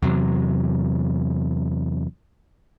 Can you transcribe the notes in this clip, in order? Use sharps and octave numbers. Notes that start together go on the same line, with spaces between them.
E2 C3 F#3